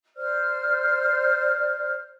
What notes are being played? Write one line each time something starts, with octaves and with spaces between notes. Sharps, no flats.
C5 D5 F6